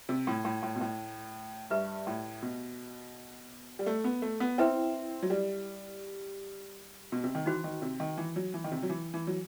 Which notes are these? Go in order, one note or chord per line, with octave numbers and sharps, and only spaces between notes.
C3
A2
A2
A2
B2
A2
G2 G4 B4 E5
A2
B2
G3
A3
B3
A3
B3
C4 E4 B4 E5 G5
F#3
G3
B2
C3
D#3
E3 D#4 F#4 C5
D#3
C3
D#3
E3
F#3
E3
D#3
C3
F#3
E3
E3
F#3